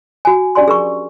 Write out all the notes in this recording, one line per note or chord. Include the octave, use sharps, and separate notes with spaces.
F#4 G#5
C#4 D4 G4 D5 G#5 C6
G#4 A#4 C#6